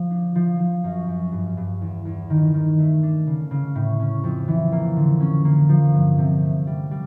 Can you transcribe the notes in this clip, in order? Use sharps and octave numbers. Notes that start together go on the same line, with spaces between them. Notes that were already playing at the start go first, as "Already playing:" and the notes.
Already playing: F3
D4
F3
F3
F#2
F#2
G2
G2
E2
E2
D#3
D#3
A3
D4
C#3
C#3
A2
C#4
F2
E3
A#3
D3
C#4
A#3
F3
G2
C3
A3
G3
G3